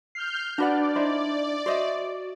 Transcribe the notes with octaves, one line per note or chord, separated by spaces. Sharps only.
F6 G6 C7
D4 F#4 B4 D5 F#5
D#4 E4 C5
F#4 C5 D#5 E5